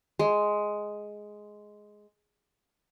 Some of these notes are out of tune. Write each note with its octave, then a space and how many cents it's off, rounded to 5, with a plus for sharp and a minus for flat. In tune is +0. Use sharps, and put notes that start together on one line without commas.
G#3 +5